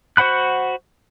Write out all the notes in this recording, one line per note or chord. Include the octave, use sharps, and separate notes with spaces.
F#4 C5 F#5 B5 F#6